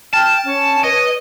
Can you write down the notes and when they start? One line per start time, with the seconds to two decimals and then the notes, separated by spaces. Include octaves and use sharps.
0.13 G5 A5 F6
0.45 C#4 C#5
0.83 B4 D#5